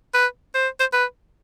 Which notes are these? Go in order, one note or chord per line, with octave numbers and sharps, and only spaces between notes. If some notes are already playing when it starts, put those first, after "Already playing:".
B4
C5
C5
B4